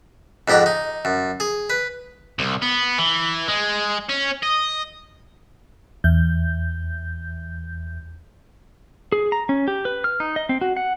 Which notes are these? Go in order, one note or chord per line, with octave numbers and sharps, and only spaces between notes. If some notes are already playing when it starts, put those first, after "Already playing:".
F2 G#2 G4 F#5 A#5
D#4
F#2
G#4
B4
C2
B3
E3
G#3
C#4
D#5
E2 G6
G#4
A#5
C#4
G4
B4
F6
D#4
D#5
C4
F#4
F#5